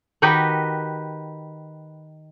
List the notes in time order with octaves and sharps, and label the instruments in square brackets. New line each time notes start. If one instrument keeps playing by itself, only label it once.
[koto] D#3 D#4 F#4 G4 B4